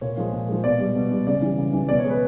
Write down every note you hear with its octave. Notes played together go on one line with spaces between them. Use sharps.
A#2 C#5
F3 G#3
A#2
F3 G#3
B2 D5
G3
B2
G3
C#3 D5
E3 G3
C#3
E3 G3
B2 D5
C#5
G#3
B4